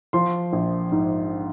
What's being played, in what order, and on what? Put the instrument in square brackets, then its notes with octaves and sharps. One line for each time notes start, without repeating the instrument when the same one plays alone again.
[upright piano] F3 C6
A#1
G#2